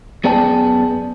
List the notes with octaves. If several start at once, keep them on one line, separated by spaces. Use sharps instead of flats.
F#2 B3 G#4 D5 G5 A5